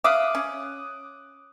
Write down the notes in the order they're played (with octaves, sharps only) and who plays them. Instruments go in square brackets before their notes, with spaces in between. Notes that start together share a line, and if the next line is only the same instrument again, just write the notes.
[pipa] E5 F5 [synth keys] D6 D#6 F#6
[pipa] C#4